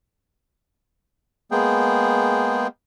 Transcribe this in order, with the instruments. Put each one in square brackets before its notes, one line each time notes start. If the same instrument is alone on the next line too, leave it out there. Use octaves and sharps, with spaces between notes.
[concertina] G#3 A#3 B3 G#4 G5